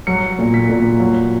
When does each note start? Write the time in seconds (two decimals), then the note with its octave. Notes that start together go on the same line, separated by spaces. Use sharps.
0.07 F#3 C#7
0.39 A#2
0.54 B6
0.69 A#2
1.00 F#3